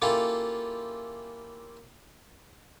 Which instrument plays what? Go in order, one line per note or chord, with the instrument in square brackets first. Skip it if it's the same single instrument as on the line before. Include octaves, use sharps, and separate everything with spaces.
[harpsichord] A#3 C#4 E4 F4 G4 A4